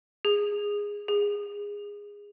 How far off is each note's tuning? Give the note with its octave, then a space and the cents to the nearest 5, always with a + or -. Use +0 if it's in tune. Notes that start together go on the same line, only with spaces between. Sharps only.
G#4 -10
G#4 -20